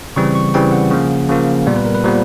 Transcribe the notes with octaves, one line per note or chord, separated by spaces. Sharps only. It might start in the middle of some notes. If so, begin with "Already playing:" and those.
C#3 E3 G3 C4 C#6
C#6
C#3 E3 G3 C4 G5
F#5
C#3 F3 A#3
C#3 F3 A#3
A#2 G3 B3 D5
B4
A#4
B4
A#2 G3 B3 C5